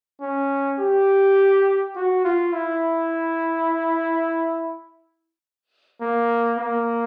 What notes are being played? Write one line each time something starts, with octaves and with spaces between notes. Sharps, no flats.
C#4
G4
F#4
F4
E4
A#3
A#3